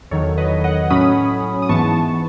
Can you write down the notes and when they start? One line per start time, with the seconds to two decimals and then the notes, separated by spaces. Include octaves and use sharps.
0.11 E2 D#3 F#3 A4 C#5
0.38 B4 D#5
0.64 D#5 F#5
0.90 A2 F#3 C#4 B5 D#6
1.62 D#6
1.69 G#2 E3 B3 A5 C#6